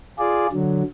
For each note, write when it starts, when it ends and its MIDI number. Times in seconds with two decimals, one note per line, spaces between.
0.19 0.47 65
0.19 0.47 68
0.19 0.47 74
0.52 0.82 50
0.52 0.82 54